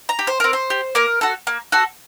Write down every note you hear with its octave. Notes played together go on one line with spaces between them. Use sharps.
A#5
G4
C5
C4 A#4
C5
G4
A#3 A#4
F#4 A4
A#3
F#4 A4